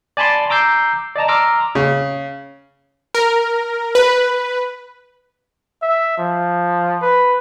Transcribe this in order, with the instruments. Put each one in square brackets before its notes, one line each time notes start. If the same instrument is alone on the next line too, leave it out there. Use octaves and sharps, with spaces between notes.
[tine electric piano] D5 G#5 A5 B5 C6 D6
A#5 D6 E6 G6 C7
D5 D#5 A5 A#5
A#5 C6 D6 E6 F6
[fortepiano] C#3
[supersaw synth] A#4
B4
[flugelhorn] E5
F3
B4